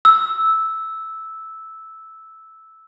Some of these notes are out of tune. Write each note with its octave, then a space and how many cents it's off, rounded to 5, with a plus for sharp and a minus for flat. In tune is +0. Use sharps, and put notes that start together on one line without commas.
E6 -10